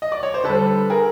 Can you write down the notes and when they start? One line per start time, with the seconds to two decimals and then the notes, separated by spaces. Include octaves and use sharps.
0.02 D#5
0.12 D5
0.23 C#5
0.34 C5
0.44 D3 G3 A4 B4
0.90 G#4 A#4